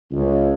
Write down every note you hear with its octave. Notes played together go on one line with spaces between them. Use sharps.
C#2